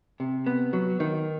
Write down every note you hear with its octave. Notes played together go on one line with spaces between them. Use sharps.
C3
B3
F#3
D#3